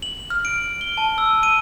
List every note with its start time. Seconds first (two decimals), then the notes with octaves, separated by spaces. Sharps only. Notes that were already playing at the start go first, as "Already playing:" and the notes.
0.02 F#7
0.30 F6
0.45 D7
0.81 G7
0.97 A5
1.18 E6
1.43 D#7